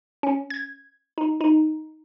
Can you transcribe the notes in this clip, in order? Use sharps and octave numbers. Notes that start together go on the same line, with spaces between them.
C#4
G#6
D#4
D#4